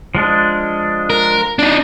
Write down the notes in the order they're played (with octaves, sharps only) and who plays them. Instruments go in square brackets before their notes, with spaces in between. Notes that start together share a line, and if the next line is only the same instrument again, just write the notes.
[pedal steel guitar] F3 G#3 D4
[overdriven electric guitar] A#4
D4 D#4